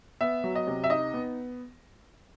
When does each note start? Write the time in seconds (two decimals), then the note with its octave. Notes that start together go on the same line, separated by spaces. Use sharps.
0.21 B3 E5
0.44 F#3
0.56 D#5
0.67 C3
0.84 E5
0.90 D#4 D#5
1.14 B3